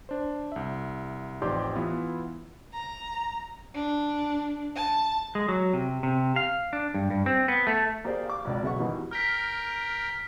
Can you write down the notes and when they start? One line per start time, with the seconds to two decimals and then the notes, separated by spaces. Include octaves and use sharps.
0.09 D4 C5
0.52 C2 E5
1.42 A1 F2 D#4 G4 D5 C6
1.75 E3 B3 E4 F4
2.73 A#5
3.75 D4
4.76 A5
5.35 G#3
5.48 F#3
5.73 C3
6.03 C3
6.36 F5
6.73 D4
6.94 G2
7.10 G2
7.26 C4
7.48 B3
7.67 A3
8.04 A#3 G4 G#4 C5 D5
8.25 F5 D6
8.45 G#1 C#2 D5
8.63 B1 C#3 G#3 E5 F#5 C#6
8.78 B2 D#3 E3 G3
9.11 A#4 G5 F6 B6